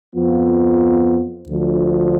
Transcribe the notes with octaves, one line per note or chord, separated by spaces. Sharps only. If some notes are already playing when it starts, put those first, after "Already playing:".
F2 F3 B3 F4
D2 D3 F3